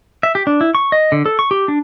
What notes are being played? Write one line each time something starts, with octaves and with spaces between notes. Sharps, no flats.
E5
G4
D4
E4
C#6
D#5
D3
A4
C#6
G4
D4